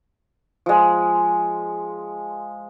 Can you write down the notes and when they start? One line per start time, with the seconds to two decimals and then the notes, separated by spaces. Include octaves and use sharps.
0.66 F3 G#3